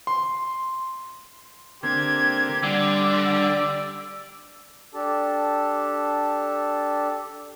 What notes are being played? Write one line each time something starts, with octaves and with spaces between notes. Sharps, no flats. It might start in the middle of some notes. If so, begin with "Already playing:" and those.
C6
D3 A#3 C4 G4 G#6
D3 G3 D5 E6
D4 G4 A4 A5